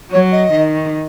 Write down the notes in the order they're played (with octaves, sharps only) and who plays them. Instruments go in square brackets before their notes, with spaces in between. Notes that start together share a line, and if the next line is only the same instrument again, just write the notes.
[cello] F#3 [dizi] C#5
[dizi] D#5
[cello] D#3